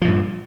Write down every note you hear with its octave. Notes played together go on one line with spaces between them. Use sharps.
G2 A#2 F3